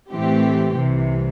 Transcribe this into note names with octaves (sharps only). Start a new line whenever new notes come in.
A2 E3 A3 C4 G4
C2 C3 E3